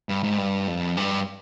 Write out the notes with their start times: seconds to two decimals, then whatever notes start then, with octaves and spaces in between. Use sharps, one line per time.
0.09 G2
0.24 G#2
0.38 G2
0.68 F2
0.97 G2